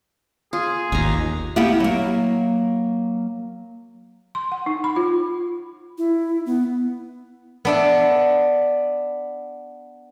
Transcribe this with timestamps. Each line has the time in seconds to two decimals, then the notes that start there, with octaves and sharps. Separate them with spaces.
0.53 F4 G#4
0.92 G#1 D#2 G#5 A#5
1.56 A#3 B3 E4 G4 F#5 G5
1.80 F#3 A#3
4.35 C6
4.52 F#5
4.66 D#4
4.84 B5
4.96 F4
5.98 E4
6.46 B3
7.65 B3 D4 E5